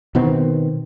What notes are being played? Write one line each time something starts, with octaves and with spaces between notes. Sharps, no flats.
B2 D#3 B3 C4